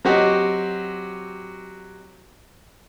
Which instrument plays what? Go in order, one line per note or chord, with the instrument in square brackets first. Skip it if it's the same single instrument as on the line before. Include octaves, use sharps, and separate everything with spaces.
[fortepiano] F#3 C4 F#4 G4 D#5